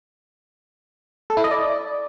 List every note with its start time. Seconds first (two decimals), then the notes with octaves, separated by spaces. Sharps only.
1.30 A4
1.37 E4
1.44 D#5
1.51 D5